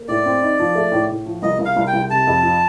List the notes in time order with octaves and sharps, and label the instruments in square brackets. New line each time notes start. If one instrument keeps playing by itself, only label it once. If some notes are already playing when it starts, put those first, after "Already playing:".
Already playing: [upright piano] A#3
[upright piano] A2 [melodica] D5
[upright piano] C4
D#4
F3
A3
A2
A2
F3
[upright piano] C2 [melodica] D#5
[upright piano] C2
[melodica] F5
[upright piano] C2
[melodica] G5
[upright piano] C2
[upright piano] C3 [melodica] A5
[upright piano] F2
F3